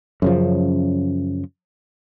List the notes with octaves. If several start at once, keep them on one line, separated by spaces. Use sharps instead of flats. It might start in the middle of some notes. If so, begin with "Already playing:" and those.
F#2 C#3 F3